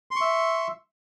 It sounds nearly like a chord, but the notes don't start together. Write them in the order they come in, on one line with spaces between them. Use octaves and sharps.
C6 C#6 E5